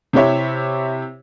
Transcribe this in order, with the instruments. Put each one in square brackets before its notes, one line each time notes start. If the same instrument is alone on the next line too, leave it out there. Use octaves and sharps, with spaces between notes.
[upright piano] C3 C4 E4 G4 C#5 E5